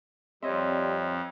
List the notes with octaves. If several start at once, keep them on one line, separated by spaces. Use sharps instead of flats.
F2 G3 C4 C#5 D#5 E5